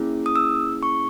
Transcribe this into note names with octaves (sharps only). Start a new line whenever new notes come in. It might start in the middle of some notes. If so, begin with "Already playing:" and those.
Already playing: A#3 C#4 E4 G#4
D#6
E6
C#6